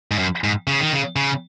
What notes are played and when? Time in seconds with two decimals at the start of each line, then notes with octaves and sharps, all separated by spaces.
0.11 G#2
0.19 F#2
0.44 G#2
0.67 C#3
0.80 D#3
0.93 C#3
1.16 C#3